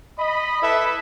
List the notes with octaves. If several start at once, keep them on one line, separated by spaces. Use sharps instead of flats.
D#5 B5
E4 A4 B4 E5